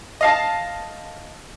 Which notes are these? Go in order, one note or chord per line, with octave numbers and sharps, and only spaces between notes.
D#5 F5 A5